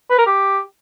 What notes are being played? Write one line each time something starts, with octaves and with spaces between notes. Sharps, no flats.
B4
A#4
G4